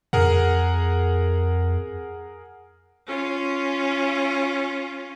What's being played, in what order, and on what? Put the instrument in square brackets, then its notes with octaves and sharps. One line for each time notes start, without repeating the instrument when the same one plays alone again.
[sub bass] F2 [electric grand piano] G#4 A#4 F#5
[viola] C#4 F4